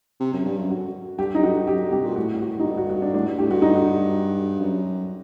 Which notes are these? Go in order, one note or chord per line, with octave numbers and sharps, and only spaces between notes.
C3
F#2
G2
F#2
F#4
G2 G4
F#2 D#4
F#4
G2
F#2 G4
G2
C3 G4
A#2
A2 F#4
G4
F#4
A2 D#4
G2 F#4
F#4
F#4
D4
A2 D4
G2
A2 G4
G2 F#4
D#4
F#4
F#2